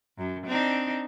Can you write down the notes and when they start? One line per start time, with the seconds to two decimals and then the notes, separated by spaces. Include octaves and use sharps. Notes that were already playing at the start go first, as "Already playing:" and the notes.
0.18 F#2
0.47 C4 D4 D#4